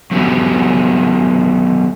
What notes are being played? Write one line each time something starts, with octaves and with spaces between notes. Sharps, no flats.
F#3 A3 B3 E4 F#4 G4